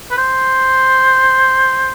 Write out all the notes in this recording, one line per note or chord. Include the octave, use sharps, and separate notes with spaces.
B4
C5